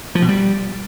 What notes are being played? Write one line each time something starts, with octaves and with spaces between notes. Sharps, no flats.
F3
B2
G3